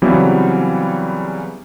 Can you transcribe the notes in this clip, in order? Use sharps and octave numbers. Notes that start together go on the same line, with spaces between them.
C#3 E3 F#3 G3 B3 C4